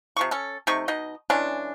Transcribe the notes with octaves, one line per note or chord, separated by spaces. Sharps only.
C3 F3 C#6
C#4 A4
C3 A3 D#4 C#6
B2 D#4 D#5
E3 G#3 C#4 D4